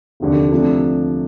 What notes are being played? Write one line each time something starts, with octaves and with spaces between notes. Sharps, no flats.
F1 D#2 D3
C3 F3 A3 D4